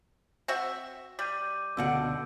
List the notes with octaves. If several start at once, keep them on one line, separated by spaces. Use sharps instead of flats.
C4 F#4 E5
G3 D6 G6 D#7
C#2 B2 D3 F#5 E6 G6 D7